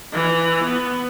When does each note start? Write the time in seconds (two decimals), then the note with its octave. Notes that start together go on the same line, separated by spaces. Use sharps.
0.12 E3
0.64 B3